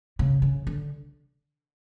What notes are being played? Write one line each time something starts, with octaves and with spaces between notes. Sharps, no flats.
C#3
C#3
D3